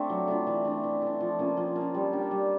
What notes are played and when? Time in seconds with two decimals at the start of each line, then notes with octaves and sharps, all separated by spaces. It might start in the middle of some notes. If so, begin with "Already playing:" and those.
Already playing: A3 C4 D4
0.10 F#3
0.28 A3 D4 F4
0.47 E3
0.65 A3 D4
0.84 E3
1.02 A3 D4
1.20 F3
1.39 A#3 C#4 F4
1.57 F3
1.76 A#3 C#4 F4
1.94 G3
2.13 A#3 D4 G4
2.31 G3